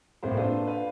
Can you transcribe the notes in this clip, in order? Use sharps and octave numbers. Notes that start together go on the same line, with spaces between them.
C2 A2 A#3 C5
D4 F4 A4 B4 C5
B4 F5